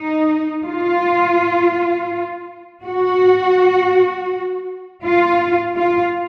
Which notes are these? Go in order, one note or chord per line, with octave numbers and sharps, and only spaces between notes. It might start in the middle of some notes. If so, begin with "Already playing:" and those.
Already playing: D#4
F4
F#4
F4
F4